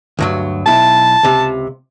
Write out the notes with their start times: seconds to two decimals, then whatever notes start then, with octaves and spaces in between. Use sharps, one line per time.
0.19 D2 G2 F#3
0.66 B1 E4 A5
1.23 C#2 C3